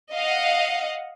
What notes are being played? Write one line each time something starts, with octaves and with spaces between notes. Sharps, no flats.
D#5 F5 F#5